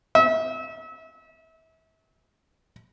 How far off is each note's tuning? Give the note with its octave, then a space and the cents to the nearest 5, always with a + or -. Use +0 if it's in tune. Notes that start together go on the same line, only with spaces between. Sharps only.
E5 -35